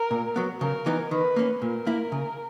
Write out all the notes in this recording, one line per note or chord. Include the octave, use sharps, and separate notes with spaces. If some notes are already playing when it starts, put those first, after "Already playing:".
Already playing: A#4
A#2
F#3 B3
C#3 A#4
E3 B3 D#4
D#3 B4
A#3 C#4
A#2 A#4
A#3 E4
C#3